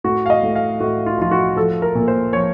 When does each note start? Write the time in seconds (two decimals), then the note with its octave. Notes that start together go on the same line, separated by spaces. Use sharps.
0.04 A2 F#4
0.26 F5
0.30 D#5
0.43 A2
0.55 F5
0.80 A2 F#4
1.06 F4
1.18 F3 F4
1.31 F#4
1.56 F3 A4
1.82 A#4
1.95 A#2
2.08 C5
2.33 F3 C#5